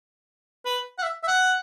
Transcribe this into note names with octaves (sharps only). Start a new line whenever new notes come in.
B4
F#5
E5
E5
F#5